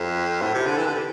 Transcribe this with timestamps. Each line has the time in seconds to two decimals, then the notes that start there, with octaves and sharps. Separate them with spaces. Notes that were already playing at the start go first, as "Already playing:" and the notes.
Already playing: F2
0.42 A2
0.54 C3
0.66 D3
0.78 E3
0.87 D3
0.95 C3